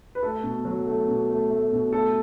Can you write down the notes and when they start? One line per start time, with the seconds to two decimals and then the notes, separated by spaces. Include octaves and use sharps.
0.15 B4
0.23 A3 A4
0.43 B2
0.65 F#3
0.87 A3
1.08 B2
1.29 A3
1.51 A3
1.72 B2
1.93 A3 A4